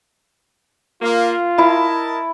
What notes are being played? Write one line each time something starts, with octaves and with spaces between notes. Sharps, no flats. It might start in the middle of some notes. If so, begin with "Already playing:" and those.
A#3 F4
E4 A#4 D#5 A5